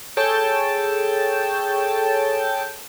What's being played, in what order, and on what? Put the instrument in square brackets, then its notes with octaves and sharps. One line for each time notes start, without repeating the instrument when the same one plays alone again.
[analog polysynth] G#4 A4 C#5 G5 A5